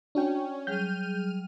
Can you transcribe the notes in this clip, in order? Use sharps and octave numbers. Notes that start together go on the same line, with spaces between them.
C#4 D4 F#4 G5
F#3 G3 G#4 F6 G6 D#7